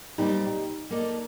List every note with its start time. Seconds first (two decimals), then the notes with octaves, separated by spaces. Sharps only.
0.18 A#2 G3 C4 D#4 G4
0.90 A#3 D#4 A4 D5